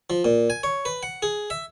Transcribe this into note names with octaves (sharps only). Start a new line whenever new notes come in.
F3
A#2
G#5
C#5
B4
F#5
G#4
E5